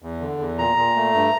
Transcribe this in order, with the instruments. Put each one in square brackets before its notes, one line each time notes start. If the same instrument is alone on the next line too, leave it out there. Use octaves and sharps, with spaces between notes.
[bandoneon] E2
D3
E2
A#2 A#5
A#2
A3
G2